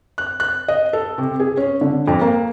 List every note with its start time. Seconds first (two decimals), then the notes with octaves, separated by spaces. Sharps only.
0.18 F#6
0.40 F#6
0.68 D#5
0.93 A4
1.18 C3
1.40 G#4
1.57 C#4
1.81 D3
2.08 F2
2.21 A#3